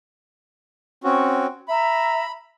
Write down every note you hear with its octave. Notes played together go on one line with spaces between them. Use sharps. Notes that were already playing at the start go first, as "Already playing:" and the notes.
C4 C#4 F#4
E5 A#5 B5